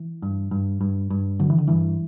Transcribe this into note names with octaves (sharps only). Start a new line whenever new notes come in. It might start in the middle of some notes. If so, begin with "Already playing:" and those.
Already playing: E3
G2
G2
G2
G2
D3 F#3
E3
D3
G2 E3